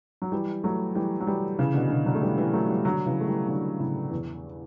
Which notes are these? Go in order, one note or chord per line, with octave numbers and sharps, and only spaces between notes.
F#3
E3 G3
F#3 A3
E3 G3
F#3
E3 G3
C#3 E3
B2 D3
B2 D3
D3 F#3
A3
E3 G3
E3 G3
F#3 A3
E3 G3
D3 F#3
C#3 E3
A3
E3 G3
D3 F#3
A2 C#3
E2